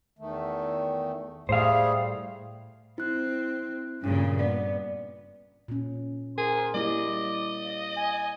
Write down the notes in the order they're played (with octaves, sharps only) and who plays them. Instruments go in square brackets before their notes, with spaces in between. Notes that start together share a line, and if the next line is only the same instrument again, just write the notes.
[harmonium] E2 D#3 A3
[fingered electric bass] A2 [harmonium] G3 A3 G#4 [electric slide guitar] C5 F5
[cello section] C4 [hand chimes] E4 F#6
[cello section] G2 A#2 C#3 [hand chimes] C#4
[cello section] B3 [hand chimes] D5
[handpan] A#2 C#4
[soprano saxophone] G#4 [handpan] A#4 [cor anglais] C5
[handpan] G3 A#3 E4 [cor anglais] D5 [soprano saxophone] D#5
[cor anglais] G#5